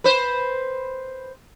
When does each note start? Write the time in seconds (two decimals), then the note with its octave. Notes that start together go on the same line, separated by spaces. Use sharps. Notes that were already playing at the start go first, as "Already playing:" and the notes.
0.04 B4 C5